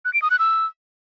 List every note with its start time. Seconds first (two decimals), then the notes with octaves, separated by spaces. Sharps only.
0.05 F#6
0.14 D7
0.22 D#6
0.31 F#6
0.39 E6